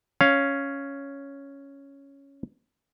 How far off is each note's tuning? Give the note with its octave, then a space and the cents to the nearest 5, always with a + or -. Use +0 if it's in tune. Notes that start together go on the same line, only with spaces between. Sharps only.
C#4 +0 F5 +0